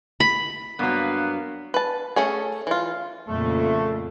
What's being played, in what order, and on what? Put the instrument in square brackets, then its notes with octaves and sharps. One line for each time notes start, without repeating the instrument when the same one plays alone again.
[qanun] B5
[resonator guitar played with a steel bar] G2 F#3 [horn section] A#3 B3
[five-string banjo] B4 A5
A3 C#4 G#4
E3 F4
[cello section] F2 A#2 C#3 [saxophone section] A3